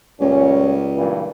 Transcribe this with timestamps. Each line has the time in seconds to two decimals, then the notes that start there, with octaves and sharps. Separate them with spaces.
0.21 C#2 A#2 G3 C#4
0.96 G2 A#2 E3